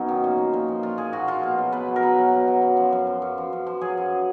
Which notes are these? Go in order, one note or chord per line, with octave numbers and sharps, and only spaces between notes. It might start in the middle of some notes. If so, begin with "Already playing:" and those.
Already playing: F#2 F#3 B3 C#4 D#4
D#3
A#2
F3
A#2
F3
A#2 F4
F3 G#4
A#2 F#4
F3 F4
B2
F#3
B2 B4
F#3
A#4
B2 B4
F#3
B2
F#3
F#2
F3
F#2
F3
F#2
F3
F#2
F3
F#3 G#4
F#2